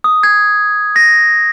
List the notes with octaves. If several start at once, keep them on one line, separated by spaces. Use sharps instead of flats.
D#6
G#6
A#6